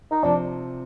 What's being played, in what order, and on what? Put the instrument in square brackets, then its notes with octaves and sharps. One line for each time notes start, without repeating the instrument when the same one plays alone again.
[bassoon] D#4
[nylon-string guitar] C3 F3 C4 [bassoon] D4